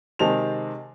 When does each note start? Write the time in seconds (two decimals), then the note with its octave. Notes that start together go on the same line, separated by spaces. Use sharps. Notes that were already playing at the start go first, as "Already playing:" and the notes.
0.19 C3 D#3 G#3 C4 A5 F7